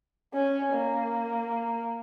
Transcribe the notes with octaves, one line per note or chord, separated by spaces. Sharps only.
C#4
A#3